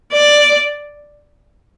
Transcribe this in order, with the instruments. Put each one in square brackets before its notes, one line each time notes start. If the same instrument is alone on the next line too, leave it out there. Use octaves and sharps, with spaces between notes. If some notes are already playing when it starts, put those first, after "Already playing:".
[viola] D5